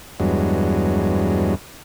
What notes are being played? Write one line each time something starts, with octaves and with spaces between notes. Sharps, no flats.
E2 G2 F#3 G#3